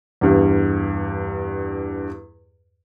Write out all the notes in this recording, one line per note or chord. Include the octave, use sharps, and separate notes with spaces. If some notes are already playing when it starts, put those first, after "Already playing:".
E2 G2